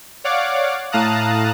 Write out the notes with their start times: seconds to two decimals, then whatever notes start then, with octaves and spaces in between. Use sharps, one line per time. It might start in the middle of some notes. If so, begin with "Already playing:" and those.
0.24 C#5 D5 F5 F#5 D6
0.92 A2 F5 A5 A#5 D#6 F#6